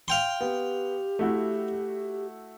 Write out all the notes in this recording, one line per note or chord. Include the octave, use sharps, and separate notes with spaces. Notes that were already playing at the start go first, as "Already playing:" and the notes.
F5 G5 C6
B3 G4
A3 E4 F#4